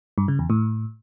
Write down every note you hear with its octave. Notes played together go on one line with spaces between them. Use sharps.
G2
C#3
E2
A2